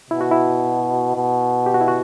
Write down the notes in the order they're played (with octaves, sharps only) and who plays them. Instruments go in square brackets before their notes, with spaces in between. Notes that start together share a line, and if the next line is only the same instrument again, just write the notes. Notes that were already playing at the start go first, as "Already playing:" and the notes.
[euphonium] B2 [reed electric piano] E4
[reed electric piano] F#4
E4
[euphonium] B2
[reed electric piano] G4
F#4
E4
F#4